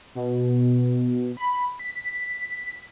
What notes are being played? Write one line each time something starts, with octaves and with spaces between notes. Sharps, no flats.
B2
B5
B6